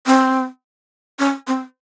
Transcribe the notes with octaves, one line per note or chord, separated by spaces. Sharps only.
C4
C#4
C4